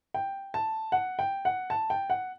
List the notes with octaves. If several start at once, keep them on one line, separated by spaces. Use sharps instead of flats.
G5
A5
F#5
G5
F#5
A5
G5
F#5